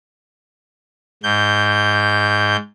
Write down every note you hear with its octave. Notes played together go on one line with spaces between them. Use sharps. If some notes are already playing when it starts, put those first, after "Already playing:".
G#2 G6